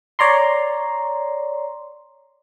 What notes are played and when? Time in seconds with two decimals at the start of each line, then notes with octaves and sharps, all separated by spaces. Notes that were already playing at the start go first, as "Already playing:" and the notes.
0.19 C#5 D5 A#5 C6